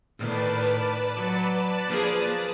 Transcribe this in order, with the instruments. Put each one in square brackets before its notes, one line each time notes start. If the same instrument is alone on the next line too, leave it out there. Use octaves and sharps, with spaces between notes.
[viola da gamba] A2 D#3 [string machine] B4 D5 A5
[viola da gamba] F#3
F3 A#3 G#4